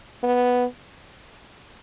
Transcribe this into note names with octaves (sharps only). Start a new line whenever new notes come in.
B3